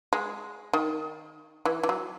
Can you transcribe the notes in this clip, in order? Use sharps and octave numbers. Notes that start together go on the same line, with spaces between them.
G#3
D#3
E3
E3
F#3